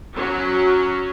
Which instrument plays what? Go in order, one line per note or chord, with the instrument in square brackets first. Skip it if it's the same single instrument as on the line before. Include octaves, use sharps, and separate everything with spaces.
[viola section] F#3 C#4 F#4